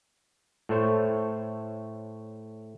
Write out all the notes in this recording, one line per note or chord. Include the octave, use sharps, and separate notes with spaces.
A2 A3 C5 C#5